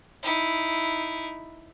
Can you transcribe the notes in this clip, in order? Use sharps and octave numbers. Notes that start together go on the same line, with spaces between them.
D#4 E4